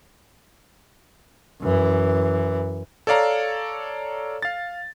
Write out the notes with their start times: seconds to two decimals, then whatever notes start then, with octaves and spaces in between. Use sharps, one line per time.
1.61 F#2 E3
3.07 A4 C#5 D5 F5 A#5
4.42 F5 A6